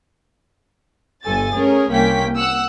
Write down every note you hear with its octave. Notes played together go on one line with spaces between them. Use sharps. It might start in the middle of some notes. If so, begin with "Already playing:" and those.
G1 G2 A4 G#5 A6
A3 C#4 G#4 A#4
C2 A#3 C#4 G5 B6
F#5 E6